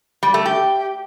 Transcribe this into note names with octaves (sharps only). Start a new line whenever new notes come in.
G3
A3
G4